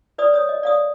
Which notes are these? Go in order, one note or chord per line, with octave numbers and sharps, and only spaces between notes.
B4 D5 D#6
C#5 D#6
D#5
D5 F5 D#6